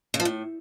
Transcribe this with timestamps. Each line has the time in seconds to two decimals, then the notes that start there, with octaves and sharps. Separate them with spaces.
0.14 C#3
0.20 F3
0.25 A2